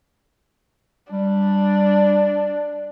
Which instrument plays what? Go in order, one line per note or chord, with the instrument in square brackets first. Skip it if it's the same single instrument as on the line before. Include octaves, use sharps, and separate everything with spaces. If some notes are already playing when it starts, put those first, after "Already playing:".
[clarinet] G3 [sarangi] D4